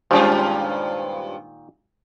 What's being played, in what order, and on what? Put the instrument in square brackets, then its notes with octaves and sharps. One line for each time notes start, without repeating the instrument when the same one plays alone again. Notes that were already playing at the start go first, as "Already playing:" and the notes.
[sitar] G2 C#4 F4 [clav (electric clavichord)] A#2 D#3 [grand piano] G3 G#3 [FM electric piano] C5